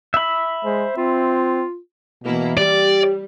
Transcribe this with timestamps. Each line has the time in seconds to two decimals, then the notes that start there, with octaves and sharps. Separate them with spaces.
0.14 E5 B5
0.65 G#3 C5
0.97 C4 F4
2.24 B2 E3 A#3 E4
2.58 G3 G4 D5